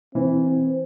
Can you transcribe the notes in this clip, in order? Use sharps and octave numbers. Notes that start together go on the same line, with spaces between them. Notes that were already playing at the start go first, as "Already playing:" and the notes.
E3 C4